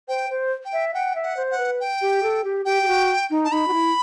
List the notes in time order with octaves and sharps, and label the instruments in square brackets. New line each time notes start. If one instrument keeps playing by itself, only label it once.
[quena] C5 [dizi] G5
[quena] C5
[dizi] G5
[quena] E5
[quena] F#5 [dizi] G5
[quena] E5
[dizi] F#5
[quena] C5
[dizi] F#5
[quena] B4
[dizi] G5
[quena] G4
A4
G4
[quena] G4 [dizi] G5
[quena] G4
F#4
D#4
[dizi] A5
[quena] D#4 [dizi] B5
[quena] F#4
E4